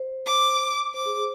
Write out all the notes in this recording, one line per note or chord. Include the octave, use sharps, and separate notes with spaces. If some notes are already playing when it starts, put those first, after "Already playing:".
Already playing: C5
D6
C5 D6
G#4
C5